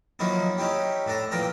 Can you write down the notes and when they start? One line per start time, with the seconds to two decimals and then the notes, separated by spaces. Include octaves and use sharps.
0.19 D#3 F3 F#3 A#3 D#4 E4
0.58 C#4 D#4 E4 G4
1.06 A2 D4 A4 A#5
1.31 A#2 E3 F3 A#4 G5 A#5